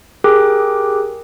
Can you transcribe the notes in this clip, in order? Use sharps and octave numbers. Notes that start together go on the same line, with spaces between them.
G4 G#4 A#4 G5 D6 F#6